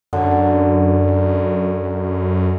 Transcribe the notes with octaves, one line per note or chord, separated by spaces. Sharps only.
F#2 D3